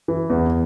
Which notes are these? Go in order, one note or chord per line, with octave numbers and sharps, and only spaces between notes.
E3
E2